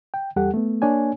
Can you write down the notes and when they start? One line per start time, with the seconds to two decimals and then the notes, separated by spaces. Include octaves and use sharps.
0.14 G5
0.36 E2 G3 G4 A4 F#5
0.54 A3 B3
0.82 A#3 D4 C#5 G#5